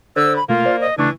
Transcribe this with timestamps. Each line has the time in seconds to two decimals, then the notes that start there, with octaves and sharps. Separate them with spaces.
0.16 D3 C5 E6
0.36 B5
0.49 B2 A3 A#3 F4
0.65 C5 D5
0.81 D#5
0.98 C#3 E3 A3 D4 C#6